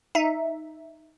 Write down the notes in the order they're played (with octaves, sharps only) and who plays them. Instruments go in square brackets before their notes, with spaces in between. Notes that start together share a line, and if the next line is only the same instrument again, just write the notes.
[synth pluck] D#4 E5